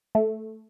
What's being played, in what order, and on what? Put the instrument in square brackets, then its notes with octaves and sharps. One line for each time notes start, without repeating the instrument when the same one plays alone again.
[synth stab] A3